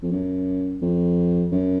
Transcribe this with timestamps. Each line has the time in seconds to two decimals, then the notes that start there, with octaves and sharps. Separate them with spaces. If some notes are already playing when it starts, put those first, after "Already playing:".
0.02 F2
0.12 F#2
0.82 F2
1.52 F#2